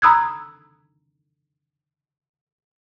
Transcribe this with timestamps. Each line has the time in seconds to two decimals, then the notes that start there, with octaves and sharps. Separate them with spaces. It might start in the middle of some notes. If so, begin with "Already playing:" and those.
0.02 A#5 B5 D#6 E6 F#6 G#6